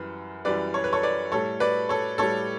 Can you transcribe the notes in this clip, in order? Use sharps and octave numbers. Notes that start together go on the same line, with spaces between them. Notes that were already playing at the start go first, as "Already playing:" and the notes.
Already playing: F#2 E3 G3 B4
F#2 E3 G3 B4 D5
C#5
B4
A4 C#5
B4 D5
A2 G3 A4 C#5
B4 D5
A4 C#5
A2 G3 A4 C#5